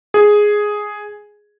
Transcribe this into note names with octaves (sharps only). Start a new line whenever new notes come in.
G#4